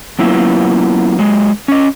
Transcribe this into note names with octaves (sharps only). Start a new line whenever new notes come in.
F#3 A#3 B3 C#4 E4 F4
F#3 G#3
C#4 D#5